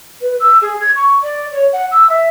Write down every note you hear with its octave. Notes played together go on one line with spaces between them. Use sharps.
B4
E6
G#4
G#6
C#6
D5
C#5
F#5
E6
E5